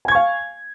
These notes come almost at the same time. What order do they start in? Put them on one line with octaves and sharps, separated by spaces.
G#5 G#6 C#6 F5